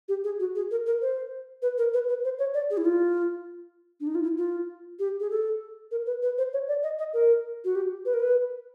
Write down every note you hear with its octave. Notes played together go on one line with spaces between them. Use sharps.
G4
G#4
F#4
G#4
A#4
A#4
C5
B4
A#4
B4
B4
C5
C#5
D5
G#4
E4
F4
D4
D#4
F4
E4
F4
G4
G#4
A4
A#4
B4
B4
C5
C#5
D5
D#5
D#5
A#4
F#4
G4
B4
A#4
B4